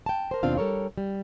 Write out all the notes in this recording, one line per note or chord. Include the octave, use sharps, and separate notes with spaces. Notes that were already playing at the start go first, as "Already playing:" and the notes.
G5 A5
A#4 C5
D#2 B2 C4 D4 F4 F5
G3 A4 A#4 C#5
G3